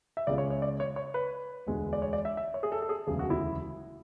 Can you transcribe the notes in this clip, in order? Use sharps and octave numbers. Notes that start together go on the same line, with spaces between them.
E5
C#2 C#3 G#3 D5
C#5
C#5
D5
C#5
C#5
B4
E1 D2 D3 G#3
D5
C#5
D5
E5
E5
C#5
G#4
A4
A4
G#4
E1 D2 C#3 F#3 G#4
F#4
E4